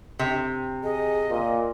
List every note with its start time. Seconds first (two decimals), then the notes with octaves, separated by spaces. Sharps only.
0.19 C3
0.84 G#4 D#5
1.30 A#2